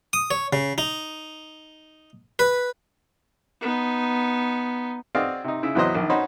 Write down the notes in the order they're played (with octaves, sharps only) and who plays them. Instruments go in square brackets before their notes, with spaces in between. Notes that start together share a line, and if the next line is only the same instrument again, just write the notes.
[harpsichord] D#6
C#5
C#3
D#4
B4
[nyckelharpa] B3 D#4
[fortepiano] C4 F#4 G#4 D5 D#5 F5
C3 D#4
C#3 E4
E2 A2 F#3 B3 C5 D#5
A#1 D#2
C#4 D#4 F#4 C5 B5